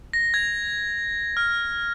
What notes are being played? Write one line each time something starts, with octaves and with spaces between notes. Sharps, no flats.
A#6
G#6
F6